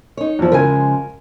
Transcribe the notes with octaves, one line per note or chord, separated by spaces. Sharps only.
D#4 C#5
E2 F3
C#3 F3 G#3 A#4 G#5